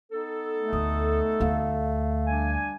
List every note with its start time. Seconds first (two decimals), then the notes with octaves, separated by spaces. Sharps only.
0.12 B3 D#4 A4
0.58 A3
0.73 D2 D#6
1.40 D2 F5
2.27 G3 D4 G#5